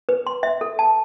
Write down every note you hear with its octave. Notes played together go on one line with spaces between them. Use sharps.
B4
C6
E5
A4
A5